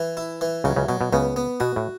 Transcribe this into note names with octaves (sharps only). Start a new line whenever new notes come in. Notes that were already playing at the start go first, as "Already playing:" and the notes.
Already playing: E3
E4
E3
C#2 C#3 F#3
C#2 C#3
B2 F#3
B2
C#2 C#3 B3
B3
B2 F#4
A2